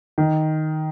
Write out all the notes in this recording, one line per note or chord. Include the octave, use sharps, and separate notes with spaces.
D#3